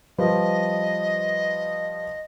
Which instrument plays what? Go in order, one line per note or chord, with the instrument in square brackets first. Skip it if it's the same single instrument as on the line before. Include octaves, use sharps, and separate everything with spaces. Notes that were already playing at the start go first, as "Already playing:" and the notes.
[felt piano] F3 G3 B4 [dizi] D#5